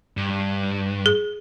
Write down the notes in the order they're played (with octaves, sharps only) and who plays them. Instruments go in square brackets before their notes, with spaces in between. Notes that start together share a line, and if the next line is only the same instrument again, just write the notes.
[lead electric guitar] G2
[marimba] G#4